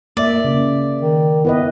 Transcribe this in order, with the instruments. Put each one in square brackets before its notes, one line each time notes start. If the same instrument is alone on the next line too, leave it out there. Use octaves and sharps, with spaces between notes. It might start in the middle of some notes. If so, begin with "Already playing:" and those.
[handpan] A#3 E5 [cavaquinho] D5
[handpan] C#3
[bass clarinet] D#3
[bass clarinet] B3 [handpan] E4 B4 D#5